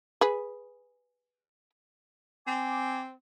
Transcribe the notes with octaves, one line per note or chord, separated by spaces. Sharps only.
G#4 B4
C4 G#5 D6